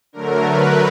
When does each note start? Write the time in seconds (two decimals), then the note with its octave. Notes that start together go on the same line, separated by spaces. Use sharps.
0.13 D3 F#3 A3 A#4
0.43 B4